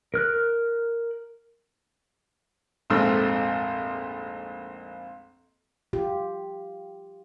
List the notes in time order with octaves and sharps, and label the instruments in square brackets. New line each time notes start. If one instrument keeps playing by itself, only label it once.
[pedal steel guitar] A#4 F6 F#6
[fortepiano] A#1 F2 G#2 A3 C4 E6
[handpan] F4 G4